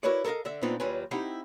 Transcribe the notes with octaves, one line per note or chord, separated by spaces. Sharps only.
E4 F#4 A#4 B4 C#5 D5
A4 A#4 C5 D#5 F5
D3 D5 E5
A#2 B3 C4 D4 D#4 F4
D#2 F#3 G3 F4 B4 G#5
C4 D#4 E4 G4 F5 F#5